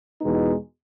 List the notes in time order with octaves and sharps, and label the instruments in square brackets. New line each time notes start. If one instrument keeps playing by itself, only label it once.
[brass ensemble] E2 B2 G#3 B3 D#4